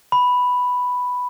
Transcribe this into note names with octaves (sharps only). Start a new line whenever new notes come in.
B5